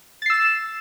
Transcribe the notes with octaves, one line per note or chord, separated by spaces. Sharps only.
E6 A6 C7 E7